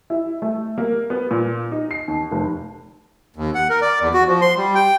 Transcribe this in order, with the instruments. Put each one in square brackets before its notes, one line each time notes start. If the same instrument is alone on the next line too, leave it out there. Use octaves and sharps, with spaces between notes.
[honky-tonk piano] E4
A3
A#3
B3
A#2
D#4
C7
D#2
F1
[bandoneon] D#2
F#5
A#4
D5
E2
F#4
F3
C6
G3
G5